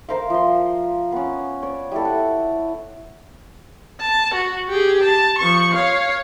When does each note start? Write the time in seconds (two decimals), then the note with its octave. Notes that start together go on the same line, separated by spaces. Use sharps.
0.09 A#4 C5 E5 F5
0.30 F3 C6
1.12 B3 C#4
1.63 C#5 D5
1.92 G3 E4 A4
2.05 F#5
4.01 A5
4.34 F#4
4.69 G4 G#4
5.03 A5
5.38 F3 C#6
5.74 C#5 F5